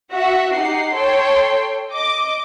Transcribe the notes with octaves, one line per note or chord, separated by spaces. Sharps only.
F#4 E5 F#5
D#4 G4 F#5 C7
A4 C#5 G5 C6
D#5 D6